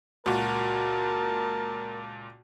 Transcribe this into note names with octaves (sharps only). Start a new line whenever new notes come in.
C#2 A#2 F#4 A#4 A5